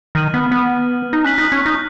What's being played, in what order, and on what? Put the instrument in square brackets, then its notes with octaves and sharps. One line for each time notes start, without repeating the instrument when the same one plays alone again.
[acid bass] D#3 [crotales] F6 G#6 D#7 F#7
[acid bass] B3
B3
D#4
[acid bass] C#4 [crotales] F#6 B6 F#7
[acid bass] D#4
C#4
D#4